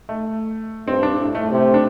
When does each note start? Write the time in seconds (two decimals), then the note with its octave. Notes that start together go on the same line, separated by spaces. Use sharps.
0.09 A3
0.87 G2 C4
1.03 D4
1.19 A2
1.35 A3
1.51 C3
1.74 D4